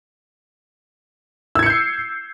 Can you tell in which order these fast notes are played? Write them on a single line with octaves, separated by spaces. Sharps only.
E6 G#6 C#7 G6 C7